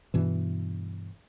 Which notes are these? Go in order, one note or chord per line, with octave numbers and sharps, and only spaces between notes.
G2 B2 E3